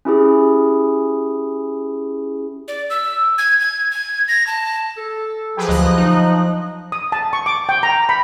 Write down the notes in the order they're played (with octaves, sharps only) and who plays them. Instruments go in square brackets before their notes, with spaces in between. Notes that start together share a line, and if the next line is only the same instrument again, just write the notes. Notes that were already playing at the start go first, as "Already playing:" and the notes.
[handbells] C#4 E4 G4 G#4
[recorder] D5
E6
G#6
G#6
G#6
A#6
A5
[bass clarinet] A4
[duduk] F3 [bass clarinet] F#3 [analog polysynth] G4 G#4 B4
[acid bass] D2 [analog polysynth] D#5 F#6
[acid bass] D#4
[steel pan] D#6
A5
C#6
D6
G5
A#5
B5